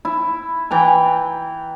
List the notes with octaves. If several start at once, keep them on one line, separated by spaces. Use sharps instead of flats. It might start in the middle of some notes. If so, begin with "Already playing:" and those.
E4
E3 G5 A#5